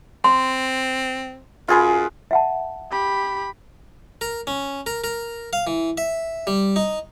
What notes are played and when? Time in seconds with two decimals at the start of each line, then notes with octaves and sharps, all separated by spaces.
0.24 C4 C6
1.68 F#2 F4 G#4 B4
2.31 E5 F#5 A5
2.91 G4 B5
4.21 A#4
4.47 C#4
4.86 A#4
5.04 A#4
5.53 F5
5.67 E3
5.98 E5
6.47 G3
6.76 D#4